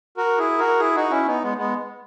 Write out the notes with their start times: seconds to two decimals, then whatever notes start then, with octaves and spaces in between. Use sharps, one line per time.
0.17 F#4 A#4
0.38 E4 G#4
0.59 F#4 A#4
0.79 E4 G#4
0.95 D#4 F#4
1.10 C#4 E4
1.26 B3 D#4
1.43 G#3 B3
1.57 G#3 B3